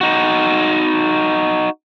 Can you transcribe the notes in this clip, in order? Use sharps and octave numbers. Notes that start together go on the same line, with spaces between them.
D#4 F#4